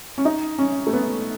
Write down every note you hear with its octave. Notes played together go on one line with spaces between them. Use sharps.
C#4
D#4
C#4
A3
B3